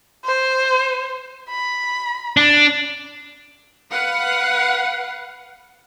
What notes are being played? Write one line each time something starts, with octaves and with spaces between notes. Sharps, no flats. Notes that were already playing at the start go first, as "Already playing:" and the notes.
C5
B5
D4
B4 F5 F#5